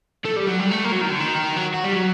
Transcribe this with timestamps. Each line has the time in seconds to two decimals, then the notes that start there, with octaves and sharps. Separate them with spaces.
0.25 A3
0.36 G3
0.47 F#3
0.59 G3
0.71 A3
0.84 A#3
0.93 F#3
1.02 D#3
1.11 D3
1.20 D#3
1.57 F#3
1.74 F#4
1.84 G3
1.93 F#3